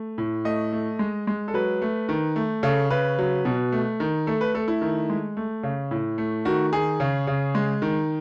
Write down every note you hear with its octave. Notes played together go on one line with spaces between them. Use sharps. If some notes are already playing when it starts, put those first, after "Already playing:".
Already playing: A3
A2
A3 D#5
A3
G#3
G#3
A4
F#3 B4
A3
D#3
A3
C#3 A4
C#3 B4
F#3
B2
A3
D#3
A3 A4
B4
A3 A4
E4
D#3
G#3
A3
C#3
A2
A3
D#3 F#4
D#3 G#4
C#3
C#3
G#3
D#3